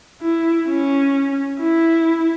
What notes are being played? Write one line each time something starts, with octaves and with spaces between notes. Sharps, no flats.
E4
C#4
E4